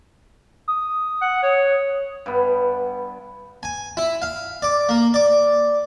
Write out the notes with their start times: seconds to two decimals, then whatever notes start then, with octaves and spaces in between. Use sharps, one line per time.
0.68 D#6
1.21 F#5
1.43 C#5
2.26 G2 B3
3.63 G#5
3.97 E4
4.22 F5
4.62 D5
4.89 A#3
5.14 D5